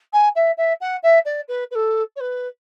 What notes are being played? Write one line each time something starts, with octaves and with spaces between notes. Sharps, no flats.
G#5
E5
E5
F#5
E5
D5
B4
B4
A4
C#5
B4